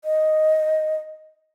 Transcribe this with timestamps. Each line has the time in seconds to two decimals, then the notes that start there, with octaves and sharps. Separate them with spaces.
0.04 D#5